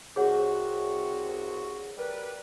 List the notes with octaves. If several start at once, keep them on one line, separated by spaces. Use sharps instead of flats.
C2 F#4 G#4 C#5 F#5
G3 A#4 B4